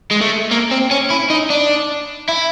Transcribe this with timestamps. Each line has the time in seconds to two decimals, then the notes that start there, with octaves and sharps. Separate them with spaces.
0.11 G#3
0.21 A3
0.51 A#3
0.72 C4
0.91 C#4
1.10 E4
1.30 D#4
1.50 D4
2.29 E4